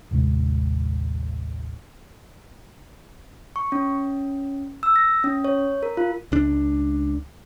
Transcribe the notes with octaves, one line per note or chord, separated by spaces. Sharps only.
A1 D#2 C3 G#3
C#6
C#4
E6
A#6
C#4
C#5
A#4
F4
C#2 D4